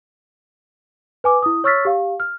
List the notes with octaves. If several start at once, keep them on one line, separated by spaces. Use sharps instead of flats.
B4 G#5 D6
E4 D#6
C#5 C#6 E6 F6 A6 B6
G4 F5
F6